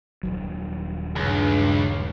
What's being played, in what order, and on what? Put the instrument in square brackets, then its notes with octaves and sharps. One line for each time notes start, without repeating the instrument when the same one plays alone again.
[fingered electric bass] D#1 B1 F#3
[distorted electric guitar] C#2 [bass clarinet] G2